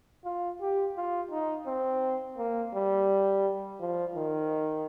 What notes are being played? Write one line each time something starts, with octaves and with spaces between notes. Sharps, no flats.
F4
G4
F4
D#4
C4
A#3
G3
F3
D#3